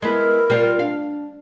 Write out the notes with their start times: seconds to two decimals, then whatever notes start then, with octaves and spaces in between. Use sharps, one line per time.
0.02 G#3 B3 E4 A#4
0.50 G3 C4 F4
0.79 D4 F5